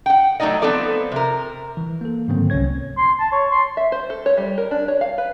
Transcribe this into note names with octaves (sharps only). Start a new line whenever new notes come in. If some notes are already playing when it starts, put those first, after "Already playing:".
F#5 G5
F#3 A3 B3 D#4 D5 D#5
F3 B3 C4 A4 D5
C3 A#4
E3
A#3 A4
G#2 D3 D#3 F#3 A#3 C4
C2 C3 C#4 C#5 G#6
C6
A5
C#5
C6
E5
C5
A4
C#5
G3
A#4
D4
C#5
F5
B4